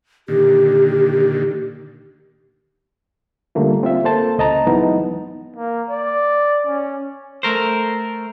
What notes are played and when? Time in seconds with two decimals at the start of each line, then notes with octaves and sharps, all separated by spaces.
0.28 A#2 D3 D#3 G4
3.55 D3 G3 A3 A#3 F4
3.83 C4 F4 E5
4.04 A#3 A4 C5 A5
4.38 C#2 D#5 A5 A#5
4.67 E3 F#3 G#3 B3 D#4
5.56 A#3
5.90 D5
6.66 C#4
7.43 A3 A#4 C5